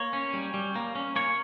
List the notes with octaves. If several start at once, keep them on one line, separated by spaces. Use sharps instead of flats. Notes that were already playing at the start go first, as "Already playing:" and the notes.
Already playing: A#3 C#5
C#4
G3
G3
A#3
C#4
A#3 C#5